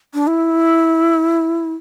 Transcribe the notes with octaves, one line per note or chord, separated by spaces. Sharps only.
D4
E4